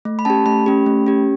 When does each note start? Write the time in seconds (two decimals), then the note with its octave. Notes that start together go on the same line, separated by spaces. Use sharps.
0.05 A3
0.19 B5
0.25 C#4 G4 A5
0.46 A3 B5
0.66 C#4 G4
0.86 A3
1.07 C#4 G4